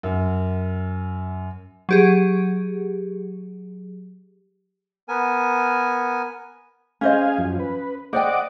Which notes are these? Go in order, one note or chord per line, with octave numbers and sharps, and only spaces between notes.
F#2
F#3 G4 G#4
B3 A#4 G#5
C#4 G#4 C5 D#5 F5 G#5
F#2 F3
B4
C5 D5 D#5 F#5 G5 D6